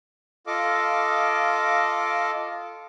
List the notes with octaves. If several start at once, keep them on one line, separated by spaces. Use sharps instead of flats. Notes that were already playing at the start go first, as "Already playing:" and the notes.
F4 A4 D#5 F5 D6